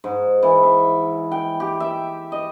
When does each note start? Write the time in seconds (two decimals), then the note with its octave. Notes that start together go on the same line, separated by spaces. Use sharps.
0.04 G#2
0.43 E3
0.63 E5
1.32 G5
1.60 G4
1.80 E5
2.32 D#5